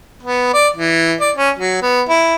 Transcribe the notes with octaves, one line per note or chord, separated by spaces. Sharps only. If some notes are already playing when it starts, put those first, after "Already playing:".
B3
D5
E3
D5
C#4
F#3
B3
E4